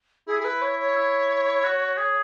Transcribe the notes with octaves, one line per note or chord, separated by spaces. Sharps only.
E4 G#4
G#4
B4
C#5
C#5
E4
F#4
G#4